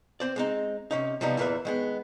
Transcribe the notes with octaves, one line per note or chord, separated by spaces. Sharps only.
C4 C5 D5
G#3 C4 D#4
C3 C#4 D#4
C3 F3 G3 B3 D#4
E2 A#2 E3 A#4 B4 E5
D#3 G#3 B3